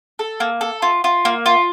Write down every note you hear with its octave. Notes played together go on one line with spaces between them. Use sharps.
A4
A#3
A4
F4
F4
A#3
F4